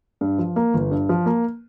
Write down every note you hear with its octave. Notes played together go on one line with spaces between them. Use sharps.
G2
F3
A#3
G1
G2
F3
A#3